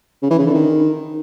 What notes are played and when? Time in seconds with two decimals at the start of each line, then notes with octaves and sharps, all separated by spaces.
0.22 C#3
0.30 E3
0.38 C#3
0.46 D3
0.54 D#3